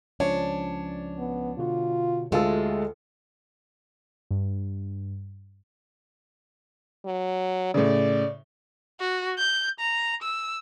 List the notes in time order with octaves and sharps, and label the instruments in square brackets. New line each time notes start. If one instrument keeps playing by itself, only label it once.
[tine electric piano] C#2 F3 C#4 [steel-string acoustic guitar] D4 [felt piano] C#5
[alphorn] B3
[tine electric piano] B2 D3 F#4 [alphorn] F4
[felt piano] D2 F4 A4 [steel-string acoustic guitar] G#3 [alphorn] A3 [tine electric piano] F#4 D#5 F5
[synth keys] G2
[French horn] F#3
[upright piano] A2 C#3 [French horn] D5
[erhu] F#4
G6
A#5
E6